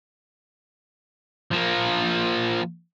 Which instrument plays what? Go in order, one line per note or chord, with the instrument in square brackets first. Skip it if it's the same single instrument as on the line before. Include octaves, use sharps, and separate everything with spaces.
[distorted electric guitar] F3 A#3